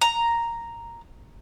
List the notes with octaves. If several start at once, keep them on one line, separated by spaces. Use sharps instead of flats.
A#5